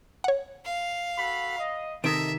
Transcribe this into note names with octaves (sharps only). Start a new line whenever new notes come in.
C#5 F#5
F5
F#4 A4 B5
D#5
C3 D#3 A4 D#5 E5 D7